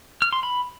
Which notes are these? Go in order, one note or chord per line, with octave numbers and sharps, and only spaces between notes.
F6
C6
B5